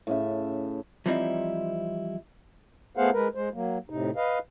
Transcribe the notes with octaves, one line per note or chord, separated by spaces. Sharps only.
A2 C#3 E5
E3 F3 G3 C4 D#4 E4
A3 B3 G#4 C5 F5 F#5
G#3 A#4 B4
G#3 C5
F#3 A#3
A2 C3 D#4
B4 D#5 F5